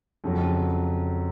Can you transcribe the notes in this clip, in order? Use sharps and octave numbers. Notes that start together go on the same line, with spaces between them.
F2 C#3 F#3